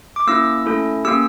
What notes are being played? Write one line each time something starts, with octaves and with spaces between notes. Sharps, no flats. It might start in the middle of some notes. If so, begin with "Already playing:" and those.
D6
A#3 C#4 E4 E6
A3 C#4 E4 A4
A#3 C#4 G4 E6